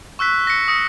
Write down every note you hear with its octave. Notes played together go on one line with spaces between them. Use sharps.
C#6 E6 F#6 B6
A#6 C#7
D#6 A#6 C#7